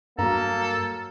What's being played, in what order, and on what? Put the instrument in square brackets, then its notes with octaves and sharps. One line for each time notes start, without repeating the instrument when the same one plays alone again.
[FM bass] G2 [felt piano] F#3 A#5 [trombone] A#3 [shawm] A4